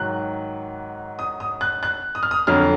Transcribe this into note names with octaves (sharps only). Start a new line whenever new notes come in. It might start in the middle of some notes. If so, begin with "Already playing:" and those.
Already playing: G#2 D#3 F#3 F#6
D#6
D#6
F#6
F#6
D#6
F6
D#6
F2 D3 F#3 F6